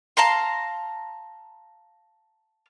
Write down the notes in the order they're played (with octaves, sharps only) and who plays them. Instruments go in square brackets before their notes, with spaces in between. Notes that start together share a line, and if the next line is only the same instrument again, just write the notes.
[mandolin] F5 A5 A#5 C6